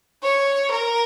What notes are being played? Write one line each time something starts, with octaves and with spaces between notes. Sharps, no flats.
C#5
A#4